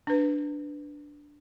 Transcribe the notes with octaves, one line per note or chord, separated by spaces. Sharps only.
D4 B4